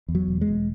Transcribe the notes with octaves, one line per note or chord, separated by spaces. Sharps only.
E2
F#3
E1
G#3
E1